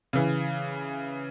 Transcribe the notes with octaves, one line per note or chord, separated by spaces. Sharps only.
C#3 E3